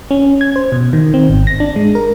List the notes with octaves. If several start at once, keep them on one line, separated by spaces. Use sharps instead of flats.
C#4
G#6
C5
B2
D#3
C4
G#1
A#6
D4
G#3
A#4